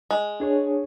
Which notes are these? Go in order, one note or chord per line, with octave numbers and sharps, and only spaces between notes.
G#3
D4 G#4 C#5